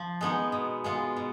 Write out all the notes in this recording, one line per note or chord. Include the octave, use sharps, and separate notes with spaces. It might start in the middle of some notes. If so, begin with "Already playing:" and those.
Already playing: F3
G#3 B3 D#4
B2
G#3 B3 F4
B2